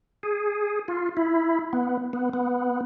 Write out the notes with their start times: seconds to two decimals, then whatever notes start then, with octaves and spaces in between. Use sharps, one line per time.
0.23 G#4
0.88 F4
1.17 E4
1.73 B3
2.13 B3
2.33 B3